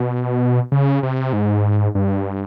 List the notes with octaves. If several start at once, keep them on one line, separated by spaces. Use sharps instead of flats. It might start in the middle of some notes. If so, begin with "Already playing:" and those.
Already playing: B2
C#3
C3
G#2
G2